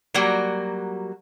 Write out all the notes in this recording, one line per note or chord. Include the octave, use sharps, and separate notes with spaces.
F#3 G3 A#3 F#4